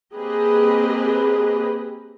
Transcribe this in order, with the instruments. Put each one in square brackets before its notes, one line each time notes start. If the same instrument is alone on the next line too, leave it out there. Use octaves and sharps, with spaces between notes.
[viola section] A#3 C4 G4 G#4 B4 D#5